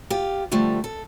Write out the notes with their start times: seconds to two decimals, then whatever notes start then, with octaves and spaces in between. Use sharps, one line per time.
0.10 F4 G4
0.51 D3 F3 G3 A3
0.84 A4